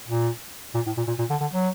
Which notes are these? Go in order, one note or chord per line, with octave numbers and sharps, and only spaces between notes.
A#2
A#2
A2
A#2
A#2
A#2
D3
D3
F#3